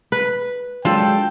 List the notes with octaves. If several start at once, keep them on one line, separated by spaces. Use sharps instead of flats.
B4
F#3 G#3 D4 F4 A4 G5